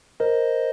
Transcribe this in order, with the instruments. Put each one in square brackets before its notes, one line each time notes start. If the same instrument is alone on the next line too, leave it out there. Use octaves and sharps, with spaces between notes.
[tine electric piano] A#4 [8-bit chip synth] C5 D#5